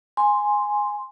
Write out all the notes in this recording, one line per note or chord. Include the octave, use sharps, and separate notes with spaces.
G#5 C6